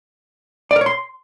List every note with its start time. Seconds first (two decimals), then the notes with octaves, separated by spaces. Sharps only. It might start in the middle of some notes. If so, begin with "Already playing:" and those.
0.71 D5
0.76 A#4
0.81 C#5
0.86 C6